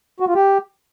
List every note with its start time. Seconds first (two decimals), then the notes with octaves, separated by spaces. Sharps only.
0.20 F#4
0.28 F4
0.35 G4